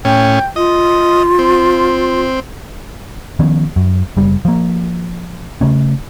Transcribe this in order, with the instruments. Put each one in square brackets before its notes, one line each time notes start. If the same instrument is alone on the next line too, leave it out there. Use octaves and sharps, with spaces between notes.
[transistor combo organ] A2 C#4 [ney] G5
[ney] F4 [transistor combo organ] D#5
[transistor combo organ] C4
[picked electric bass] D#3 F3 B3 C#4
F#2
F#1 G3
F3 A#3
C#3 A3 C#4